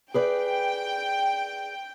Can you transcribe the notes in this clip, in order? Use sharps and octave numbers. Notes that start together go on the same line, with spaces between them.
G#4 B4 D5 G5